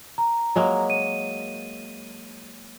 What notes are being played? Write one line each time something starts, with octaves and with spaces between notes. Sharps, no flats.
A#5
F#3 G#3 A#3
D#7